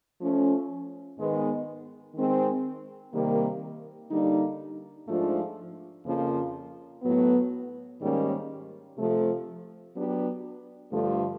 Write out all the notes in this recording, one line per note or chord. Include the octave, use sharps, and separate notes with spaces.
F3 A3 C#4
G#2 D#3 G#3 B3
D#3 G#3 C4
C3 D#3 G3 A#3
D3 G3 A#3 D#4
G#2 F3 A3 D4 F4
F2 C#3 F3 A#3
A2 F#3 B3
G#2 D#3 G3 A#3 C#4
C3 F3 A3
F#3 B3 D4 G4
G2 D3 F3 A3